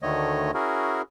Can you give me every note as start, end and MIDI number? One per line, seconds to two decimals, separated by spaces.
0.02 0.51 38
0.02 0.51 50
0.02 0.51 51
0.02 0.51 57
0.02 0.51 73
0.02 0.51 75
0.54 1.02 61
0.54 1.02 64
0.54 1.02 66
0.54 1.02 68
0.54 1.02 70